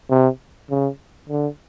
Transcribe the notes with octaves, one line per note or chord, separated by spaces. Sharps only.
C3
C#3
D3